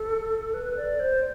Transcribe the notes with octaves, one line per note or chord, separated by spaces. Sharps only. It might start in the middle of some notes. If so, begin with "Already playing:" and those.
Already playing: A4
B4
D5
C5